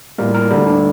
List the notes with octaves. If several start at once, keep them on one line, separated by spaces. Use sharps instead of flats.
A2 G3 A#3 A#4
A#4
D2 D3 G3 A4
D4